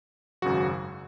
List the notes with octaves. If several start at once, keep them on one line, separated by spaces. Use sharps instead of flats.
G#1 F#2 C#3 F#3 F#4